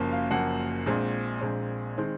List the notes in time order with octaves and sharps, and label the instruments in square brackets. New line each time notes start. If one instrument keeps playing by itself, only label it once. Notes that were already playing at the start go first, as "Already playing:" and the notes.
Already playing: [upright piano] F#1 F#2 F3 A#3
F5
F#1 F#2 F3 A#3 F#5
A#1 A#2 G#3 C4
A#1 A#2 G#3 C4
D#3 G#3 C4